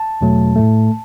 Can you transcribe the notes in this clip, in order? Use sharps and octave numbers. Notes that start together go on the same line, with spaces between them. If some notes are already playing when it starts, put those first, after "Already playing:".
Already playing: A5
E2 B2 F#3 A3
A2 A3